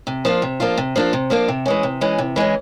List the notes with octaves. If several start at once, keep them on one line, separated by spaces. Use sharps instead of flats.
C3
F3 A#3 D4 F4
C3
F3 A#3 D4 F4
C3
F3 A#3 D4 F4
C3
F3 A#3 D4 F4
C3
E3 G#3 C#4
C3
E3 G#3 C#4
C3
E3 G#3 C#4